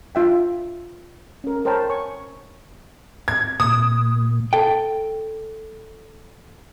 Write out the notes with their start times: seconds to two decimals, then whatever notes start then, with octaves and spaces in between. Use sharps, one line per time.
0.15 D4 F4 E5 G5
1.44 C#4 A#4
1.65 A#4 C5 C#5 G5 A5 B5
1.90 C#5 G#5 C#6
3.28 G#6
3.60 A#2 D#6
4.53 A4 G5